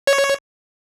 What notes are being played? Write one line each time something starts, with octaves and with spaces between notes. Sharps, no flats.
C#5